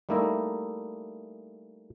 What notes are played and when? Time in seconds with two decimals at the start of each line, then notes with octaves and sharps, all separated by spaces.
0.09 G3 A3 A#3 D#4 E4 D#5